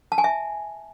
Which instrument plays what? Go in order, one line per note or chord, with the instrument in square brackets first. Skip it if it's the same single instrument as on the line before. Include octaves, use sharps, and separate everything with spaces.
[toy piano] A5
G#5
E5